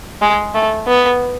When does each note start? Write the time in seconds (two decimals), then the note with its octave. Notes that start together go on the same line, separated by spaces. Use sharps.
0.22 G#3
0.55 A3
0.87 B3